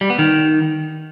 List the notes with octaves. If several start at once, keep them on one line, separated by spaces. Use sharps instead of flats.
G3
B3
D#3